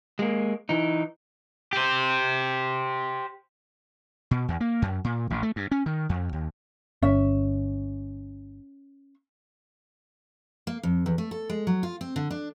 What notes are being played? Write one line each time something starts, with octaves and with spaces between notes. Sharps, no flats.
G#3 A#3
E3 D#4
G4 C5
B2
E2
A#3
F#2
A#2
A1
A3
G2
C#4
D#3
F2
D#2
G1 C#4 E5
A#3
F2
E2
A3
A4
G#3
F#3
F4
C4
D3
D4